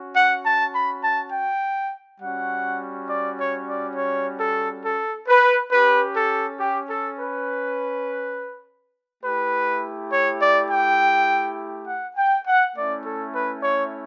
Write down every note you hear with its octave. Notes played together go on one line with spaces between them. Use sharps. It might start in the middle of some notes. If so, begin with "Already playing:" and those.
Already playing: C#4 F#4
F#5
A5
B5
A5
G5
G3 C#4 F#4 F#5
D5
C#5
D5
C#5
A4
A4
B4
C#4 G4 B4
A4
G4
A4
B4
A3 E4 G4 B4
C#5
D5
G5
F#5
G5
F#5
A3 C#4 E4 D5
A4
B4
C#5